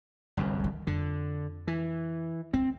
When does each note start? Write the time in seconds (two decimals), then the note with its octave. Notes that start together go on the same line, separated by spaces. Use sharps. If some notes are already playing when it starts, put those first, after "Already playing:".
0.37 G1 C2 F#2
0.60 D2 D#3
0.87 F2 D3
1.67 E3
2.53 D2 C4